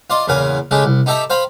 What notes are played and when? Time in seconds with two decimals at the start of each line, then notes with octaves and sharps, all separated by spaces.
0.10 F4 D5 D#5 C6
0.28 E2 A#2 C#3 A#4 G#5
0.71 C#3 G#3 A3 G4 G#4
0.85 C2
1.06 D#4 G4 A4 E5 A5 A#5
1.30 C5 F5 G5 A#5 B5